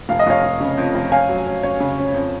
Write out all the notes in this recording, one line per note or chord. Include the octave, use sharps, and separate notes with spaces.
F1 F5
D#5
F1 C#5 F5
F1
C#3
F2
F1
C#4 F5 G#5
F#3
C#4
C#4 C#5
C#3
C#4
F2